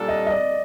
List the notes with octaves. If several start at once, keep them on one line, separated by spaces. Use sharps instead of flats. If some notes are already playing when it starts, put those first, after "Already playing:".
Already playing: A#2 G3 D4 A4
D#5
D#5
D5